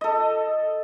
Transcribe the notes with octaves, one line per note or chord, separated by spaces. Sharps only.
A4 D#5